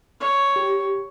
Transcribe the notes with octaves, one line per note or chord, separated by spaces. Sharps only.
C#5
G4